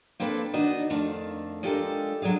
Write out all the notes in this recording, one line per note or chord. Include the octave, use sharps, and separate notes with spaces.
A#3 C4 D4 A4 B4
D#3 D4 D#4 F#4
F2 D#3 A3 D4 F5 A5
G#3 D4 F4 G4 A4 A#4
E2 F#3 D4 G#4 F5